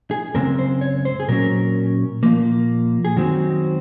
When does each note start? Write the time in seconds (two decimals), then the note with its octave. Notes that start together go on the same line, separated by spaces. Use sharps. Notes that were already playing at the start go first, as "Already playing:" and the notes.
0.11 G#4
0.34 F#2 C#3 G#3 C4 A#4
0.59 C5
0.81 C#5
1.05 C5
1.20 G#4
1.28 A#2 F#3 C#4 A#4
2.23 A#2 F3 A#3
3.05 G#4
3.16 F#2 D#3 G#3 C4 F#4